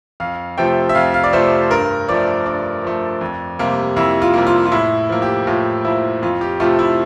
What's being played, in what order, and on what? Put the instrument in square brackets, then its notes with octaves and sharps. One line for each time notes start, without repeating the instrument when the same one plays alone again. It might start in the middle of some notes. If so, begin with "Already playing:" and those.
[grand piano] F2 F5
C3 F3 A3 G5
E5
F2 F5
F5
D5
C3 F3 A3 C5
G2 A#4
F3 A3 D5
G2 D5
F3 A3
F2
C3 G3 A#3
F2 E4
F4
C3 G3 A#3
F4
F4
A2 E4
F3 A#3
G4
A2 F4
F3 A#3 E4
F2 F4
G4
C3 F3 A3 F4
E4